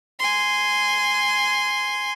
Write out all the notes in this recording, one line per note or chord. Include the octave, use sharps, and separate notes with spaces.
G#5 C6